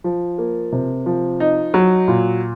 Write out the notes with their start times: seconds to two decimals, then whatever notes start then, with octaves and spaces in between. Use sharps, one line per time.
0.04 F3
0.38 A#3
0.72 C3
1.06 F3
1.40 D#4
1.74 F#3
2.08 A#2